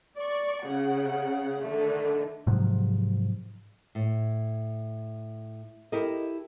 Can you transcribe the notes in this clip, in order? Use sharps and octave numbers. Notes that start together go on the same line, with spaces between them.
D5 C#6
C#3 F#5
D3 D#3 A3
G#2 C3 F3 F#3
A2
E4 G4 A4 A#4 D#5